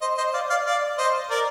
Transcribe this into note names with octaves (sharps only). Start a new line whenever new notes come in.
C5 D#5
C5 D#5
D5 F5
D5 F5
D5 F5
C5 D#5
A#4 D5